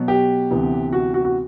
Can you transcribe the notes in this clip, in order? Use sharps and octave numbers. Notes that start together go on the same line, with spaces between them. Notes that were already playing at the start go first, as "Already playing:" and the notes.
Already playing: B2 F#3 B3
G4
D2 C3 E3 B3
F#4
F#4
F#4